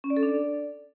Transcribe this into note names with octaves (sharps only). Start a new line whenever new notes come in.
C#4
D5
A4
D4
D5